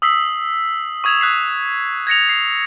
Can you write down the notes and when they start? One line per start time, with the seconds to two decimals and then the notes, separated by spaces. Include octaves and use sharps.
0.02 D#6 E6 B6 C7 F#7
1.04 C#6 D#6 G#6 E7 F7
1.21 D#6 F#6 B6 C7
2.07 G#6 A#6 C#7 F7
2.29 C7